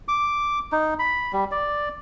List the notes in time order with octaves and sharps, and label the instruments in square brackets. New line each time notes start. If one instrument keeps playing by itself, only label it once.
[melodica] D6
D#4
B5
G3
D5